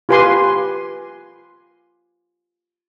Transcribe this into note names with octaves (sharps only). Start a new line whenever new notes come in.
F4 G4 B4 G#5 C6 D6